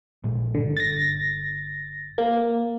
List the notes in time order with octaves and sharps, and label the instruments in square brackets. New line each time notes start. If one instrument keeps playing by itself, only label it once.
[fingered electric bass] A#1 A#2 G#3
[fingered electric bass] G1 [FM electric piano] D3
[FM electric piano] A6 A#6
A#3